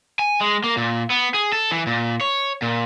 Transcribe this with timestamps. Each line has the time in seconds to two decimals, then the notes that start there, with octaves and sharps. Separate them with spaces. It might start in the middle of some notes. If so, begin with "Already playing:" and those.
0.19 G#5
0.41 G#3
0.64 A#3
0.77 A#2
1.10 B3
1.34 G#4
1.53 A4
1.71 E3
1.87 A#2
2.21 C#5
2.62 A#2